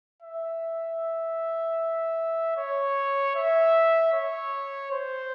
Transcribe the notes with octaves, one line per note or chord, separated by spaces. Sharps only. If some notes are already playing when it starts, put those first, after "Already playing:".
E5
C#5
E5
C#5
C5